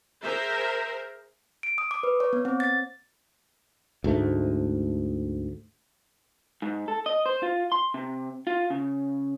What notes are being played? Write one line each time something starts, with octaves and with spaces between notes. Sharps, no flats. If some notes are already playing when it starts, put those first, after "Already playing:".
G#4 A#4 C5 E5
D7
D#6
D6
B4
C#5
B3
C4
A6
D2 G#2 A3
G#2
A4
D#5
C5
F4
C6
C3
F4
C#3